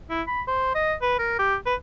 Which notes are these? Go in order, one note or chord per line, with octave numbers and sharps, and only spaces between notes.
E4
B5
C5
D#5
B4
A#4
G4
B4